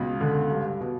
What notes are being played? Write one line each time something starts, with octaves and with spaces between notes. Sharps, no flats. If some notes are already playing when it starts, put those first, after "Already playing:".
Already playing: C#2 B2
D3
G2
B2